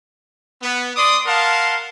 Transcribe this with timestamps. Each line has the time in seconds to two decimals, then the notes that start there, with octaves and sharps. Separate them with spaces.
0.62 B3
0.95 D5 C6 D6 D#6
1.26 A#4 F5 F#5 A5 C6